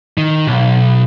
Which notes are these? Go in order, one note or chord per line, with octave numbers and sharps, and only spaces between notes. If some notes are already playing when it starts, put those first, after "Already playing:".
D#3
B1